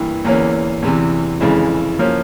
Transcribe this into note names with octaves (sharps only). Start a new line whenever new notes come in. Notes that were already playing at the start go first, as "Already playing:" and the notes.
Already playing: G2 E3 A#3
E2 E3 A#3 C#4
E2 C3 E3
F2 C#3 E3 G#3 E4
F3 A#3 C#4